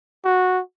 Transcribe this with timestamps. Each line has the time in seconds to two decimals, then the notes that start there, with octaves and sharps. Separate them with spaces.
0.25 F#4